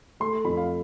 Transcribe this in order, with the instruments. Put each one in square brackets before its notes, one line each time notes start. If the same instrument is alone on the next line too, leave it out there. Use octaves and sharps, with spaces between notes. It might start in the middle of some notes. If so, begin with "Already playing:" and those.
[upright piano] A3 [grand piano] C6
[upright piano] F2 [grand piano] B5
[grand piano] F5